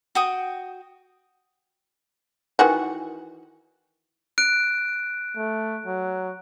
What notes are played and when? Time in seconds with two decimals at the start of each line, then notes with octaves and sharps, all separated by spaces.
0.15 F#4 G5 D#6
2.59 D#3 E3 F#4
4.38 F#6 D7
5.37 A3
5.86 F#3